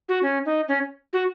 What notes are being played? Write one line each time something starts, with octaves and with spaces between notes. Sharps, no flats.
F#4
C#4
D#4
C#4
F#4